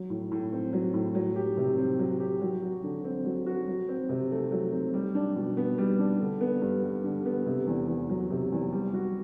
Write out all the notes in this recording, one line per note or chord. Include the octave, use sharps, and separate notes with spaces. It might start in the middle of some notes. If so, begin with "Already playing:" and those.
Already playing: F#3
A2
A2
C4
F#3
A2
F#3
G4
C3
C4
F#3
G4
F#3
F#4
D3
C4
F#3
F#4
F#3
C4
C3
A3
F#3
C4
G3
D4
B2
B3
G3
D4
D3
B3
G2
G3
D3
B3
C3
E2
E2
F#3
C3
E2
G3
F#4